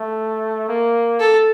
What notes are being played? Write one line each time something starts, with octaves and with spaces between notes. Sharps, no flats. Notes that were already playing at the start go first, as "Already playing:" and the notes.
Already playing: A3
A#3
A4